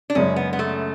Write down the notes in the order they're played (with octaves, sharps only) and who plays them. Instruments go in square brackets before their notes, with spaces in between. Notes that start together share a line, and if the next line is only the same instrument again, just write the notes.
[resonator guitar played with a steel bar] D4
[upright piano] F#2 C#3 G#3 [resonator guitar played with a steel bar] C#4
[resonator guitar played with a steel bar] B3
B3
A3